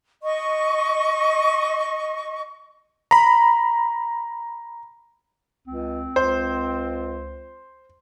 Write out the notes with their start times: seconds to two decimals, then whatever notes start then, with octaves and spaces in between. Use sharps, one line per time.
0.23 D#5 C#6
3.11 A#5 B5
5.67 C#2 C4
6.16 C#2 C5